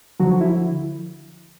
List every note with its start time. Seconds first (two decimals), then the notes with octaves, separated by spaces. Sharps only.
0.20 D2 D3 F3 F#3 F#4
0.41 E4